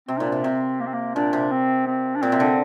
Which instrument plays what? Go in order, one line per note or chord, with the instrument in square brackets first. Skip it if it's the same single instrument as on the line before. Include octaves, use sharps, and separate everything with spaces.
[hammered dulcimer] C3 [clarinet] C4
[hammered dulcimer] A#2 [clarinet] D#4
[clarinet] D4
[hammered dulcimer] C3
[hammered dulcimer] C3 [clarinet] C4
[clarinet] A#3
C4
A#3
[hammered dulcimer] A#2 [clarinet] D4
[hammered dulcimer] C3
[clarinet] C4
C4
D4
[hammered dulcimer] A#2 [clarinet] C4
[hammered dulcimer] C3
D3